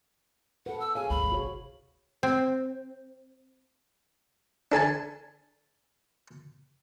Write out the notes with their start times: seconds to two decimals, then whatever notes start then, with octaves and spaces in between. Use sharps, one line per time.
0.66 A4 B4 F#5
0.80 E6
0.95 G#4 C#5 F5 G#5
1.10 G1 D2 B5
1.32 C2 F#4 G#4 C#5
2.23 C4
4.72 D4 A4 G#5 A5